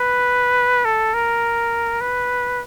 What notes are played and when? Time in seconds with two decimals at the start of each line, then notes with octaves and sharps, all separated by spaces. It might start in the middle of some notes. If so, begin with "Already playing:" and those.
Already playing: B4
0.85 A4
1.14 A#4
2.01 B4